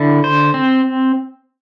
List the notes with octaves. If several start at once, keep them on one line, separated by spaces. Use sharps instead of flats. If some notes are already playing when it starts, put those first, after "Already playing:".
Already playing: D3 E4
C5
C4